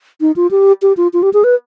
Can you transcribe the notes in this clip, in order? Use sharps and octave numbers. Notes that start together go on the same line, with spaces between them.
D#4
F4
G4
G4
F4
F4
G4
G#4
B4